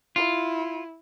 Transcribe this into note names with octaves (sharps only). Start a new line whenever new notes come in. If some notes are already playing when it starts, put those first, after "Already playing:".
E4 F4